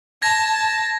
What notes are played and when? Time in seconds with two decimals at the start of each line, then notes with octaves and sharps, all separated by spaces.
0.22 A5 G#6 A#6